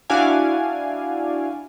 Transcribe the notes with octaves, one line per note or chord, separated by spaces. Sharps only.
D4 E4 F#4 D5 F5 G#5